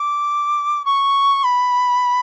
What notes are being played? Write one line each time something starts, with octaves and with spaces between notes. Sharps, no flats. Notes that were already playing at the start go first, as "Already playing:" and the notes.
Already playing: D6
C#6
B5